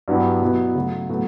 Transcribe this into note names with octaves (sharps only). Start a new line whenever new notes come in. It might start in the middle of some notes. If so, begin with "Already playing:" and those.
G2 F#3 B3 E4 G4
B2 F#3 B3 E4
C#3 F#3 A3
A2 F#3 B3 F#4 A4